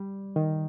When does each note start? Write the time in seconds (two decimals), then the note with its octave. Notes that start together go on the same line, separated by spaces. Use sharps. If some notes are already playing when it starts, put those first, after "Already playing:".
Already playing: G3
0.36 D#3